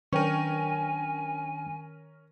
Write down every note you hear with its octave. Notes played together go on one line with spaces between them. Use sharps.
D#3 C#4 D4 A#4 G5 G#5 C#6 D#7